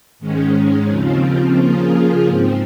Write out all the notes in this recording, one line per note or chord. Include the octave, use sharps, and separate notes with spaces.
G#2 D#3 G#3 C#4
D#2 C#3 F3 C4 F4
C#3 F3 A#3 F4 G#4
G#2 F3 C4